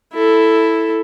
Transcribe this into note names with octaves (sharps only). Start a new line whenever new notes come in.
E4 A4